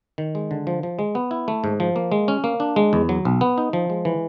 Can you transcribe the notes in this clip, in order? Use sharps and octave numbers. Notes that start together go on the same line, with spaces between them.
D#3
G#3
D3
F3
F3
G#3
B3
E4
A3
G#2
F3
A#3
G#3
C#4
A#3
D4
G#3
E2
F#3
B1
B3
D#4
F3
G#3
E3